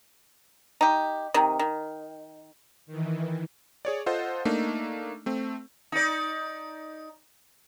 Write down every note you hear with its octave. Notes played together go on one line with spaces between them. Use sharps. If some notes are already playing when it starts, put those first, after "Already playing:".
D#4 G4
C3 D#3
D#3
D#3 E3
G#4 C#5 D5
F4 A4 C5 D#5 F#5
A3 A#3 D4 D#4
A3 C4
D#4 D5